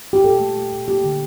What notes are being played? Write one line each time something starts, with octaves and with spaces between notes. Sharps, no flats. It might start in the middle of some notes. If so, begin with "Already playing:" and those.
G4
A#2 A4
A3
A3
A#2
A#3 G4
D3